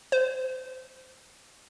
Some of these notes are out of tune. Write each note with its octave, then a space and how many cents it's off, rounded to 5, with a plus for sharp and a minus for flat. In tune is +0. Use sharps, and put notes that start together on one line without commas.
C5 -25